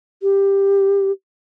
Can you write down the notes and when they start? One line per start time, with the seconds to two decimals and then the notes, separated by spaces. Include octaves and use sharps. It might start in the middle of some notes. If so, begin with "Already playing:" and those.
0.22 G4